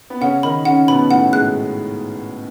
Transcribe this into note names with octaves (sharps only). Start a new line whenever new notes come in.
B3
C#3 C#4 F#5
D#3 D#4 B5
C#3 C#4 F#5
B2 B3 B5
A2 A3 F#5
G#2 G#3 F#6